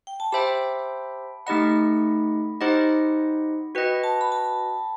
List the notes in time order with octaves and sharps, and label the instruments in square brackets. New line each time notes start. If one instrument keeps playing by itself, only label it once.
[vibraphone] G5
A5
[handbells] G4 C5 E5 G5 [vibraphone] B5
[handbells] A3 D#4 G4 D#5 F#5 [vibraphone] B5
[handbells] D#4 G4 C5 D#5 F#5
[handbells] F#4 B4 D#5 [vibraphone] G5
[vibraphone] A5
B5
A5